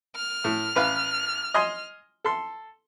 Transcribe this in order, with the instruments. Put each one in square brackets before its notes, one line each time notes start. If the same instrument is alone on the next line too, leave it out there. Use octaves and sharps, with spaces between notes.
[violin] F6
[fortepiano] A2
A1 B4 F5
D#5 G#5 C6
A4 C6